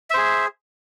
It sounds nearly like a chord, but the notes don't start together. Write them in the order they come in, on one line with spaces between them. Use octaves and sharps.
E5 C5 G#4